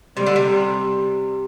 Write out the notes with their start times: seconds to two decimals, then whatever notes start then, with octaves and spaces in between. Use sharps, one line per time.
0.17 C3 G3
0.26 D3
0.36 C3